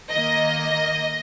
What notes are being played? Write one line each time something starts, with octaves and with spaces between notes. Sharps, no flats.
D#3 A#3 D#5